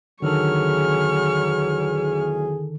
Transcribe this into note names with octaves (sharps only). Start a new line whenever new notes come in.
E2 D3 D#3 F#3 G#4 A4 C#6 F6